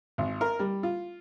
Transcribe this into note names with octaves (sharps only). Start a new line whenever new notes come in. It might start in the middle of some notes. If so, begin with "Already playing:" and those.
G#1
A#4
G3
F4